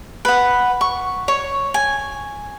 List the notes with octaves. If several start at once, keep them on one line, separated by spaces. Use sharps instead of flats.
B4 F#5
C#6
C#5
G#5